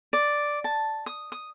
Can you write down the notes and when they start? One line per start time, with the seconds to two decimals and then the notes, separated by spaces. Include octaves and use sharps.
0.13 D5
0.64 A5
1.06 D#6
1.32 D#6